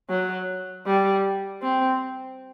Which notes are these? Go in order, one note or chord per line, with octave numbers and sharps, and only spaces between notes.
F#3
G3
C4